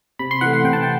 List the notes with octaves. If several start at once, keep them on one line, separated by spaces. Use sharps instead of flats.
C3 B5
C6
E3 A3 F#5
F#5
C3 G5
A5
G5